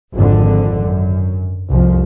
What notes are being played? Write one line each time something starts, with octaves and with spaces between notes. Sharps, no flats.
G#1 F2 D3
F#2
C2 F2 F3